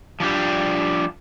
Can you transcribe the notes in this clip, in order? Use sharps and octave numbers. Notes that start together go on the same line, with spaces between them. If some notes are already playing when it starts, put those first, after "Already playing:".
F3 G3 D4 G4